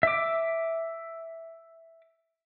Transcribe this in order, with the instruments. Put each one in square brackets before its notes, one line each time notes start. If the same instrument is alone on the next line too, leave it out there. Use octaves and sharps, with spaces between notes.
[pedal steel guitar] E5 D6